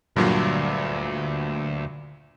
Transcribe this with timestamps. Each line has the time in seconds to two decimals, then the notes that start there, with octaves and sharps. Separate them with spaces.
0.16 D2 G2 A#2 F#3